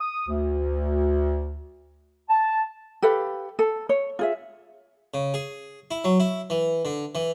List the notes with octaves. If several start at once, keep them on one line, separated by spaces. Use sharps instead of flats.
D#6
D2
A5
G4 A4 B4 F5
A4
C#5
F4 G#4 E5
C#3
G#4
E4
F#3
E4
E3
D3
E3